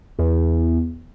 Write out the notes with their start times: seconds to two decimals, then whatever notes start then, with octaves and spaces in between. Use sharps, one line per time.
0.19 E2